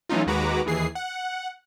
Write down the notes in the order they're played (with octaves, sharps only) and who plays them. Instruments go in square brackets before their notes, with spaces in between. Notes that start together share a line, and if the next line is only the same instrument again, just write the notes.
[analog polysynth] E3 F#3 A3 C#4 D#4 F4
D#2 G#3 F#4 B4 A#5 D6
D#2 E3 G#4 C7
F#5